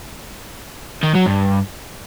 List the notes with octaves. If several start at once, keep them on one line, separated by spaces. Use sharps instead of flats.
D#3
F#3
G2